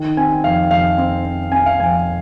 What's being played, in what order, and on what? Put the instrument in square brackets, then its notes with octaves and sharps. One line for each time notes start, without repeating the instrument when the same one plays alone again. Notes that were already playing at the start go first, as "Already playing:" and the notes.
Already playing: [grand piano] D#3
C4 G#5
F2 F5
F2 F5
C4
C4
C4 G#5
F5
F2 G#5